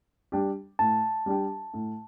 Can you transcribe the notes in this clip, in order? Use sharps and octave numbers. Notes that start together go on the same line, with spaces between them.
G3 D4 G4
A2 A5
G3 D4 G4
A2